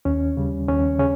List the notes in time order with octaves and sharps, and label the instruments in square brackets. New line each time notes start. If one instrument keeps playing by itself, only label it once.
[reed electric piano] D#2 C#4
C#3 G3
D#2 C#4
C#3 C#4